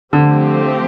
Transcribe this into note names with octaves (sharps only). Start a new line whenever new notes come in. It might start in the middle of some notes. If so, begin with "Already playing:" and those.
D3 F3 A3 C4 G4